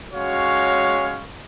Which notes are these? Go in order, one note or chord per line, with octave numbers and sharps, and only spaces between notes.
G#3 C#4 F#4 C#5 F5